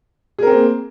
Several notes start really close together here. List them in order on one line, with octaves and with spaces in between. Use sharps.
G#4 A#4 C4 A#3